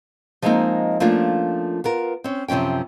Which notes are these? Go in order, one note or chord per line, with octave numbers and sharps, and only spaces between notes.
F3 G3 G#3 A#3 C4 D#4
F3 A3 A#3 C#4 D4 F4
B3 F4 A#4
C4 C#4
F#2 C3 F3 C#4 G5